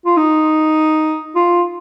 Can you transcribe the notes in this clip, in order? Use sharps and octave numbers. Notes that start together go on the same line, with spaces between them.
F4
D#4
F4